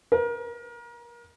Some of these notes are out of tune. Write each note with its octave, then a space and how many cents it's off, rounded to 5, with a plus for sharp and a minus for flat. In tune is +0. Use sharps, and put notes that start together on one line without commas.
A#4 +30